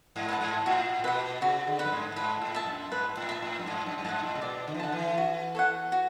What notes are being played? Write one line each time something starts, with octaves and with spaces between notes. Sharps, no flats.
G#2
B4 F#5 A5
G#2
A2 F#4
B2 B4 F#5
C#3 F#4
D3
B4 F#5
F#2
G#2
G#2 B4
A2
E5 A5
F#2
G#2 B4
A2
E5 A5
A2
F#2
G#2 D5
F#2
F#2
G#2 F#5 A5
A2
C#3
B2 D5
D3
E3
D3 F#5 A5
E3
F#4
A4 C#5 F#5
F#4